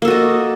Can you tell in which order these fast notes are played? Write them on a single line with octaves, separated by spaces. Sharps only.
A#3 A4 F#4 D#5